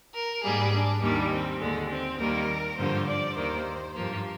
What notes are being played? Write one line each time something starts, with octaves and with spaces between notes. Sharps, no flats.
A#4
G#2 G3 A#3 G#4
D4
D#2 D#3 G3 A#3 D4
C4
D#2 D3 G#3
C4
D#2 D#3 G3 A#3 A#4
G2 D3 F3 A#3 C5
D5
D#2 D#3 A#3 C5
G2 F3 A#3